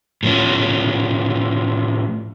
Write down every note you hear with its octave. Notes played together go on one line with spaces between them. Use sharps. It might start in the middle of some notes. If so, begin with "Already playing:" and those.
A2 F3 C#4